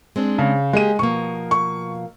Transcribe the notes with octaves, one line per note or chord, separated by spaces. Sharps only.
G#3 C4 D4
C#3
G#3 A#3 G4 G#4 D#7
B2 F3 A#3 C#6
C#6